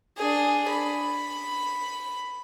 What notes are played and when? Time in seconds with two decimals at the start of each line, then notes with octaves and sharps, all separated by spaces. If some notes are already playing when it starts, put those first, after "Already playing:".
0.17 D4 G#4
0.70 B5